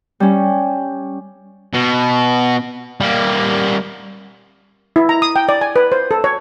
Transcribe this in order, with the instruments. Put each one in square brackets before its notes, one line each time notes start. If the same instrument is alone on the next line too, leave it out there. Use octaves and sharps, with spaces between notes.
[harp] G3 C#4
[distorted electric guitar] B2
G3 A#3
[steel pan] E4
A#5
D#6
G5
D5
G#5
B4
C5
A4
C#5